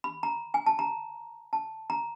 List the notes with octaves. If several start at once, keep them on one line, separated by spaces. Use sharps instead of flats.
B5
A#5
G#5
A5
A#5
A5
A#5